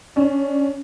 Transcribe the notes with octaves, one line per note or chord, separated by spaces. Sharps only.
C#4 D4